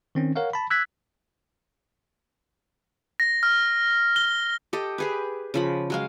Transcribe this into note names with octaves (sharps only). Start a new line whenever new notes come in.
D#3 C4 C#4
A#4 C#5 F5 F#5
A5 B5
E6 F#6 G#6 B6
A#6
F6
G7
G4 A4 D#5
G4 G#4 B4
C#3 F3 B5
F#3 G#3 F5